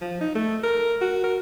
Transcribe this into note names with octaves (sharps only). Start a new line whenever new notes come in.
F3
D#4
A3
A#4
F#4
A#4